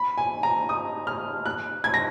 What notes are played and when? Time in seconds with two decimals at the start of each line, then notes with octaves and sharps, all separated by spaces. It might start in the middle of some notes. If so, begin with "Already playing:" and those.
Already playing: B5
0.18 G#5
0.43 A#5
0.69 D#6
1.07 F6
1.46 F#6
1.84 G#6
1.94 A#6